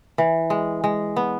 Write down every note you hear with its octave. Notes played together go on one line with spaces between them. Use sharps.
E3
G#3
G#3
B3